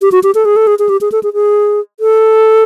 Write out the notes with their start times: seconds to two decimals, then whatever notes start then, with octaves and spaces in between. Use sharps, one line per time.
0.02 G4
0.12 F#4
0.23 G4
0.35 A4
0.45 G#4
0.56 A4
0.67 G#4
0.79 G#4
0.89 G4
1.01 G#4
1.12 A4
1.23 G#4
1.34 G#4
2.00 A4